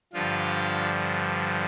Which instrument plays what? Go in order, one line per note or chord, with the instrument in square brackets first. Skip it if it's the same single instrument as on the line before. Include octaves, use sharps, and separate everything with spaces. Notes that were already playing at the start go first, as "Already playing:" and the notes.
[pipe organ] G2 D3 F3 F4